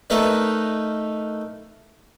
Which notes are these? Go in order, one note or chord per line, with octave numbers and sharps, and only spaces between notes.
A3 D#4 A#4 B4 D5